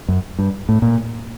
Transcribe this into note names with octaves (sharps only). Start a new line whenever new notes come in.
F#2
G2
A2
A#2